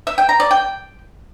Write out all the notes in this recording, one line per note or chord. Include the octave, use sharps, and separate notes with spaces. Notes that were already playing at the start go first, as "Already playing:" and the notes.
E5
G5
A#5
D5
G5